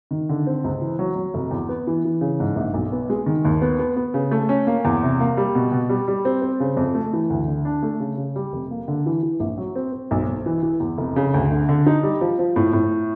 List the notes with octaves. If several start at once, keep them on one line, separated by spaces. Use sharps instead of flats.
D#3
D3
C4
C#2
E3
F#3
F#3
F1
E2
B3
E3
E3
C#3
G#2
A#1
B1
B3
G#3
D#3
D#2
B3
B3
B3
C#3
A3
C#4
A#3
E2
C3
A#3
G3
B2
B2
G3
G3
C4
C4
C#3
F2
A3
E3
D2
D3
D4
A3
C#3
C#3
G3
F1
A#3
D3
E3
E3
A#1
F#3
C4
C4
B1
B1
E3
E3
E2
F1
C#3
D2
D3
D3
D#4
G3
F3
F3
A2
A2